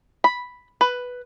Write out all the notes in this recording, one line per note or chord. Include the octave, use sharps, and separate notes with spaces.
B5
B4